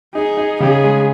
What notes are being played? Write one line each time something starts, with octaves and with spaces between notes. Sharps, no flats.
D#4 G#4
D#4
C#3 G#4
G#3